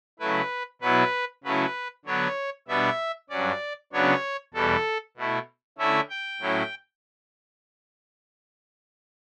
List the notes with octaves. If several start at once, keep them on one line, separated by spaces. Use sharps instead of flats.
C#3 F#3 A3 E4 B4
B2 F#3 B3 E4 B4
C#3 F#3 A3 C#4 E4 B4
D3 F#3 B3 D4 C#5
B2 G3 B3 D4 E5
G2 F#3 C#4 D5
C#3 F#3 B3 D4 C#5
E2 B2 G3 A4
B2 A3 E4
D3 A3 C#4 E4 E5
G5
A2 F#3 C#4 E4